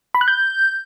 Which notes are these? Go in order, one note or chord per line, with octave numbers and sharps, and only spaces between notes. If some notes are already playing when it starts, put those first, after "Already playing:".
B5
F#6
G6